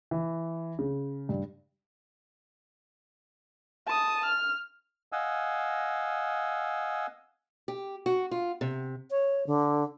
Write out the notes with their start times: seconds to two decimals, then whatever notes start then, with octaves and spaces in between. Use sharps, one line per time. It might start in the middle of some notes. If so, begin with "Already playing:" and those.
0.11 E3
0.79 C#3
1.29 G2
3.87 A5 D#6
4.26 F6
5.12 D#5 F5 F#5 G#5 E6
7.68 G4
8.06 F#4
8.31 F4
8.61 C3
9.10 C#5
9.46 D3